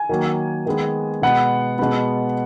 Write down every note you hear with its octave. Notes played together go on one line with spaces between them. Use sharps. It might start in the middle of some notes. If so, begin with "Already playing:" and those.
Already playing: G#5
D#3 F#3 A#3
D#3 G#3 B3
B2 G#3 B3 F#5
B2 G#3 B3